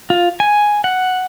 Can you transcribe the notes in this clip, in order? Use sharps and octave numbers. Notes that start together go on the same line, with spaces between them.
F4
G#5
F#5